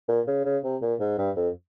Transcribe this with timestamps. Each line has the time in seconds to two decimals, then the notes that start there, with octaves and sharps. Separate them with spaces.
0.08 A#2
0.27 C#3
0.45 C#3
0.64 C3
0.82 A#2
1.00 G#2
1.18 G2
1.36 F2